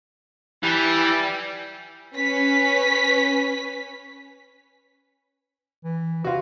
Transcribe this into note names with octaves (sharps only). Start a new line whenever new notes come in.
E3 G3
C#4 B4 B6
E3
C3 F4 F#4